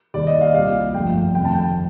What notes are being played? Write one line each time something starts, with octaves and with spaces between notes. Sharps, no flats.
D#2 D#3 G3 D5
D#5
F5
C2 A#2 G3 F5
G1 F2 D3 F3 A3 G5
F1 F2 D#3 A3 G5
A5
G5